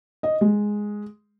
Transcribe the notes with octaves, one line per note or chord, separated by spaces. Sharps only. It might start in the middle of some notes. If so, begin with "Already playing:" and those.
D#5
G#3